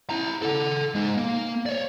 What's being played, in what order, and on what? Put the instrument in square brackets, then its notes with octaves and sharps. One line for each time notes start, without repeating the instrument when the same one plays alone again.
[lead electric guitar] E4 A#5
A4 F#5
G#3 D#4
A#3
C#5 D5